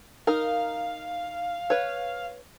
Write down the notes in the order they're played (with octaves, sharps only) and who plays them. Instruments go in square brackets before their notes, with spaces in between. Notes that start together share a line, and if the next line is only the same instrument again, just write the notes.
[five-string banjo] D#4 A#4 [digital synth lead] F5
[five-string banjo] B4 C#5